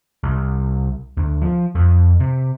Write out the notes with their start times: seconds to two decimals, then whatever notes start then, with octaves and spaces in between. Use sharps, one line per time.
0.24 C2
1.17 D2
1.42 F3
1.75 F2
2.20 C3